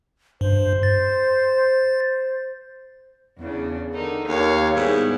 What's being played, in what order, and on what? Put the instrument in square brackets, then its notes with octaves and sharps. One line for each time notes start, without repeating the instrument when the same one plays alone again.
[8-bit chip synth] G2 [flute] C5
[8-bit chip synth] A6
[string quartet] E2 C#3 D4
D3 D#3 D#4
[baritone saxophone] D#2 [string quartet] A#4 C#5 F5
[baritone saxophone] G#2 [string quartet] G3 B3 E4